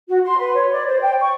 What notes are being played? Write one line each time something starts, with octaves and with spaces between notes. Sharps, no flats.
F#4
C6
B4
C#5
D5
C5
G5
C#6